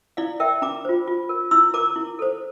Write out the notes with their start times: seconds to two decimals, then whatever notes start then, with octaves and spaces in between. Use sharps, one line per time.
0.17 E4 D5 F5
0.40 A#4 E5 G5
0.62 D4 A#5 D6
0.85 F4 C5
1.07 F4
1.29 A#4
1.51 E4 C6 E6
1.74 A#4 A#5 D6
1.96 E4
2.19 A4 C5